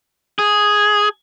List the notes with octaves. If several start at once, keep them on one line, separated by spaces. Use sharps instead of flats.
G#4